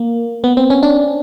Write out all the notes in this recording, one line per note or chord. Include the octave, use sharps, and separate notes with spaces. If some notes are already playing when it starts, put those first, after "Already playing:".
Already playing: A#3
B3
C4
C#4
D4